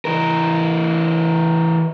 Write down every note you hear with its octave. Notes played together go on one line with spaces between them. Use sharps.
E3 A#4